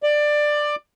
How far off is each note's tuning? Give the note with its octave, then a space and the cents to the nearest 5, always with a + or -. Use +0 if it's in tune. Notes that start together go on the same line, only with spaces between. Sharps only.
D5 +15